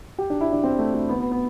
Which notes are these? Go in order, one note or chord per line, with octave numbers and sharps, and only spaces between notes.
G4
D4
E4
D4
C4
A3
A3
B3
B3
B3